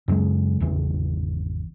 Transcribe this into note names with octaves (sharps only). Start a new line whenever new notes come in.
F#2 C#3 F#3 G#3
G#1 E2 C#3 E3